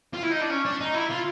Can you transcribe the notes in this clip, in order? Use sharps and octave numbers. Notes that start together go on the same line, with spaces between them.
F4
E4
D#4
D4
C#4
D4
D#4
E4
F4